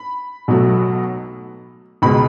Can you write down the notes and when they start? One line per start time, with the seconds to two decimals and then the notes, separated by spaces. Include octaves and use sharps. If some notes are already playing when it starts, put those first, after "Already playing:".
Already playing: B5
0.48 B1 B2 F#3 A3
2.02 C#2 B2 G#3 B5